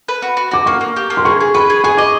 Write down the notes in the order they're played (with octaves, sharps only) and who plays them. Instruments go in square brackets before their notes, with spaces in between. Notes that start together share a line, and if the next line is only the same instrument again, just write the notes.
[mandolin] B4
F#4
F#4
[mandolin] F#4 [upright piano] D6
[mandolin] A#3 [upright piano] C#6
[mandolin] A#3
G4
A#3
[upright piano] C6
[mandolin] G#4 [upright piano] C#6
[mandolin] G#4
[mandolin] B4 [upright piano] C#6
[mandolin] G#4
[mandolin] G#4 [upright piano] C#6
[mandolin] D#5 [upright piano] D6